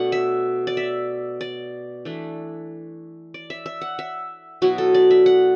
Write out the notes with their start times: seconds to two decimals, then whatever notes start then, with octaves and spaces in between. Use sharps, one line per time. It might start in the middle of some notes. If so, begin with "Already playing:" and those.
Already playing: B2 A3 D4 D5 F#5
0.12 E5
0.67 D5
0.77 E5
1.41 D5
2.05 E3 A3 D4
3.34 D5
3.50 E5
3.66 E5
3.81 F#5
3.99 E5
4.62 B2 F#3 B3 E4 F#4
4.78 A4
4.94 D5
5.11 E5
5.26 F#5